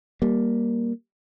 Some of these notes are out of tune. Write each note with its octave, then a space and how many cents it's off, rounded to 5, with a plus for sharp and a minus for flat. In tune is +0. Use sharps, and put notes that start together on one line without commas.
G3 +0 A#3 +10